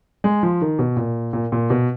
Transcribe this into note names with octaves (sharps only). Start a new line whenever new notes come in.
G#3
F3
D#3
B2
A#2
A#2
A#2
B2